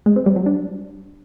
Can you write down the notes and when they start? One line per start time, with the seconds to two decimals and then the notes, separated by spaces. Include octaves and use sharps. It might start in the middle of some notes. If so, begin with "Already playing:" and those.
0.06 G#3
0.16 C4
0.26 G3
0.36 F#3
0.46 D4